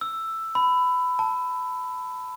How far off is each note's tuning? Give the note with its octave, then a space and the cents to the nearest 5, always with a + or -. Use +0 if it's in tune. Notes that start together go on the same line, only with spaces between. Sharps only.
E6 +5
B5 +15
A5 +10